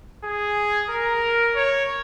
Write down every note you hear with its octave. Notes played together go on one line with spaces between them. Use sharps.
G#4
A#4
C#5